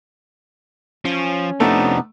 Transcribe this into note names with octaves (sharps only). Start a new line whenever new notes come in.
F3 C#4
C3 F3 A3 B3 D4 D#4